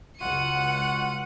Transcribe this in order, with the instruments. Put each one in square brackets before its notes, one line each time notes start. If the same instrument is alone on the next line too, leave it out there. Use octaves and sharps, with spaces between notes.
[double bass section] C#2 [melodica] F4 F#4 [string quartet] F#5 F#6 [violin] C#7 D#7